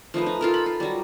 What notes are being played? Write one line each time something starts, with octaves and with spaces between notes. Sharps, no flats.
F3 A3 D#4 B4
D#4
F4 A4 A#4
B5
F4
F#3 G3